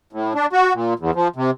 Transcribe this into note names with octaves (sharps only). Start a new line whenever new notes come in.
A2
D4
F#4
A#2
E2
F3
C3